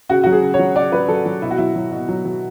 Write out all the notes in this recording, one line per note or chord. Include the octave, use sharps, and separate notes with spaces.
C#3 F#4
F#3 F#4
G#4
C#3
C#5
F#3
C#3 D5
F#3 B4
F#3 A4
F#3
B2 E4
F#4
F#3 E4
F#3
B2
F#3
F#3